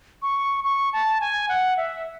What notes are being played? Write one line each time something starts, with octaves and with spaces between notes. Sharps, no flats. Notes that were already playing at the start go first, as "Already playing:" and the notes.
C#6
C#6
A5
G#5
F#5
E5